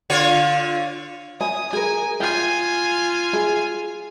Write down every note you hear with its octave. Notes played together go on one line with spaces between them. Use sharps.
D3 F4 C#5
G#5 D#6
G#4 A#4 G#5
F4 G5 G#5
G#4